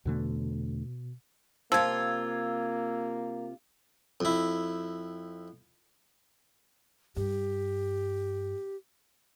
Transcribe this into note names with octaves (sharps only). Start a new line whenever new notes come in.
E2 B2 D3 A3
C3 F3 A#3 F4 E6 G#6
F2 E4
G2 G4